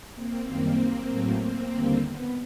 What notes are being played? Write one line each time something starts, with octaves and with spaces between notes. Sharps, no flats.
A#3 C4
F#2 D#3 G3 A#3 C4
A2 F#3 A3
A#3 C4
D#2 D3 G3
B3